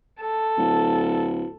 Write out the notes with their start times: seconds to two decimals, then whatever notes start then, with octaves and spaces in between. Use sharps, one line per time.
0.21 A4
0.58 D1